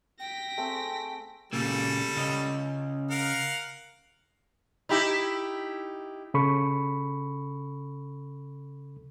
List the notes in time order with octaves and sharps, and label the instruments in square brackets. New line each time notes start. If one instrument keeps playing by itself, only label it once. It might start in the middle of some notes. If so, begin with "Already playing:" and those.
[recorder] G5 [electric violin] A#6 B6
[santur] A3 C4 G#4
[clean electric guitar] A#2 C#3 A#3 [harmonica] G3 A4
[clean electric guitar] C#3 C#4 D#5
[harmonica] A#4 F5 F#5
[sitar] D#4 E4 G4
[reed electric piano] C#3 A4 B5 C#6